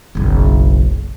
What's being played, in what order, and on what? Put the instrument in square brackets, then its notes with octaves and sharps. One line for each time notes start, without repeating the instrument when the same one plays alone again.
[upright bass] F#1 B1